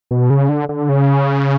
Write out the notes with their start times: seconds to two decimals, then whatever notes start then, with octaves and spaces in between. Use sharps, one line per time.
0.11 B2
0.30 C#3
0.49 D3
0.69 D3
0.89 C#3